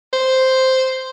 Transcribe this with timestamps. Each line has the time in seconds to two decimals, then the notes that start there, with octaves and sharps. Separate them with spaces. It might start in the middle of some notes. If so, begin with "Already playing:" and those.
0.13 C5